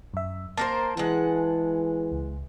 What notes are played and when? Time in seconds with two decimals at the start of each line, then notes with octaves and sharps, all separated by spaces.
0.14 F#2 E5
0.57 A#3 A#4 C5 A5
0.97 E3 G#3 F#5
2.12 C#2